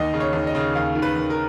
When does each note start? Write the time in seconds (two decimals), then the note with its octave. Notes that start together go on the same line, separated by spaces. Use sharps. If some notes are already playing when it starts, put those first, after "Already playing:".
Already playing: D#2 D#5
0.13 C#3
0.20 C#5
0.33 D#2
0.47 D#5
0.55 C#3
0.75 D#2 F5
0.95 D#3
1.02 B4
1.16 D#2
1.30 A#4